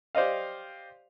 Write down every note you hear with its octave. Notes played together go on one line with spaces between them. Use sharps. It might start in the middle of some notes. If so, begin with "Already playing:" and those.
G4 C5 D5 D#5 F5